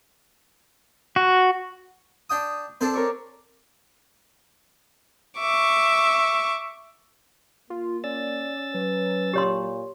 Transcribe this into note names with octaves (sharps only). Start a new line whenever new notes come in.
F#4
D4 G5 D#6
C4 D4 A4 C5
A#4 C#5 D6
E5 C#6 D6
A#3 F4
C#4 D5 E6 A6
F#3 B4
A#2 G4 C#5 C6